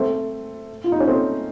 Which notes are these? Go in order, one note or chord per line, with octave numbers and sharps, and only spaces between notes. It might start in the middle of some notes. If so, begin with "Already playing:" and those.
Already playing: A3 C4
F4
D#4
C#4
A3 C4